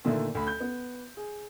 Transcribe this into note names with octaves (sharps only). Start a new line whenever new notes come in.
A#2 D3 D#3 A3
D2 B5
G6
B3
G#4